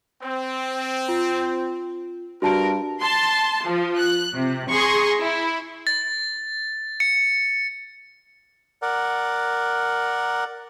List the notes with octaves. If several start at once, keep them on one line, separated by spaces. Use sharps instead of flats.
C4
F4
G2 F#4 A#4 A5 D7
A5 C6
F3
F#6
C3
G#4 G#5 A#5 C6 C#6
E4
A6
C#7
A#4 D5 F#5